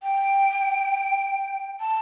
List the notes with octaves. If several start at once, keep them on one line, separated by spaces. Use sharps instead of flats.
G5
A5